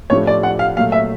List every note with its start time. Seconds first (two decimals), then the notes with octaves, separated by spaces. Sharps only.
0.10 A2 F3 A3 D4 G4 C#5
0.27 D5
0.43 F#5
0.59 F5
0.77 A#2 F#3 A3 F5
0.92 E5